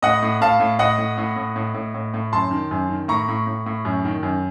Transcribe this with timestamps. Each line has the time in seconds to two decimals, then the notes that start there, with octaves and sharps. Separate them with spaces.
0.02 A2 D#5 F#5
0.22 A2
0.41 A2 F5 A5
0.60 A2
0.79 A2 D#5 F#5
0.98 A2
1.18 A2
1.36 A2
1.56 A2
1.74 A2
1.94 A2
2.14 A2
2.33 F#2 A5 C6
2.51 D#3
2.71 F#2
2.89 D#3
3.08 A2 A#5 C#6
3.28 A2
3.47 A2
3.66 A2
3.85 F#2
4.05 D#3
4.23 F#2